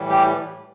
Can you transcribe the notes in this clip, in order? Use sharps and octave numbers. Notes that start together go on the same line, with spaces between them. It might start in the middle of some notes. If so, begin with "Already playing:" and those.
Already playing: A2 E3 G3
G4